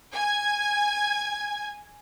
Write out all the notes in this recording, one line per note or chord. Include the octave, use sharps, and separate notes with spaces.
G#5 G#6